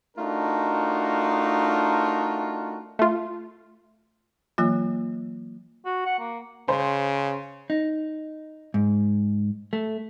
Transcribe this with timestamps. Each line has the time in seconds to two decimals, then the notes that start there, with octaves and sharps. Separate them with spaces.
0.17 A3 D4 D#4 F4 F#4 A#4
2.99 A3 F4
4.58 E3 F#3 A#3 F4
5.85 F#4
6.06 F#5
6.19 A#3
6.69 C#3 C5
7.70 D#4
8.74 G#2
9.73 A3